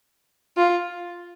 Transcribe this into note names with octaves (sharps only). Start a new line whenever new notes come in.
F4